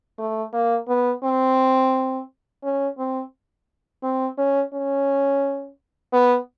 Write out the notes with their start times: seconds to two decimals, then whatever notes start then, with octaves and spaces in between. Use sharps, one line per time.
0.19 A3
0.53 A#3
0.88 B3
1.24 C4
2.64 C#4
2.98 C4
4.03 C4
4.38 C#4
4.73 C#4
6.13 B3